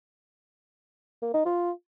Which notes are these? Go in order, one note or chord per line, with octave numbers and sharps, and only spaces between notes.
A#3
D#4
F4